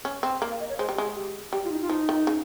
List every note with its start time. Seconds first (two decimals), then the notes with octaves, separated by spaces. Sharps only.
0.05 C#4
0.23 C4
0.42 A#3
0.51 F5
0.60 D#5
0.69 C#5
0.79 G#3 C5
0.89 G3
0.97 G#3 G#4
1.16 G4
1.53 G3 G4
1.65 F4
1.71 D#4
1.81 F4
1.89 F3 D#4
2.09 D#3
2.27 C#3